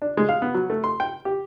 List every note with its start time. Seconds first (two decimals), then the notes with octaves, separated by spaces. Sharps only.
0.02 D4
0.17 G#3
0.29 F5
0.42 B3
0.54 F#3
0.70 A3
0.84 C6
1.00 G5
1.25 G4